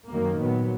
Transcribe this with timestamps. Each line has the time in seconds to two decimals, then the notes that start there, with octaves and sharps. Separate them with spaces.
0.11 F#2 D#3 F#3 A#3
0.41 A#2 F#3 B3